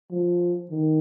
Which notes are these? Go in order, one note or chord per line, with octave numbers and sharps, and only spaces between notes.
F3
D#3